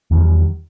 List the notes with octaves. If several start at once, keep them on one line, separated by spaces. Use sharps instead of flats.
E2 D#3 G3